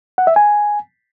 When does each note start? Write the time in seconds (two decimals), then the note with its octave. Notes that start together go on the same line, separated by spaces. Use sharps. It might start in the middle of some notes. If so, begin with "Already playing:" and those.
0.18 F#5
0.27 E5
0.36 G#5